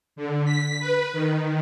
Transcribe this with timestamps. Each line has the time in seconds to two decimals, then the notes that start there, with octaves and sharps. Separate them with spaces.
0.16 D3
0.45 B6
0.80 B4
1.13 D#3